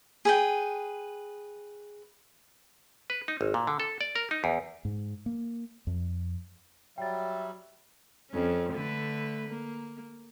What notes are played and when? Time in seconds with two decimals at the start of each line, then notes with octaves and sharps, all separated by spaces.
0.25 G#4 B4 G5
3.10 B4
3.28 D#4
3.41 G#1
3.54 A#2
3.67 D3
3.80 A4
4.01 D5
4.16 A#4
4.31 D#4
4.44 E2
4.85 G#2
5.26 A#3
5.87 F2
6.98 F#3 G3 E5 G5 A6
8.31 F2 C#4
8.73 D3 A3 B4
9.49 A#3